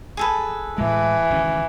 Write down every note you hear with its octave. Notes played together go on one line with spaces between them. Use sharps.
G#4 A4 B4
A2 E3 G#3
G#1 C#3 C#4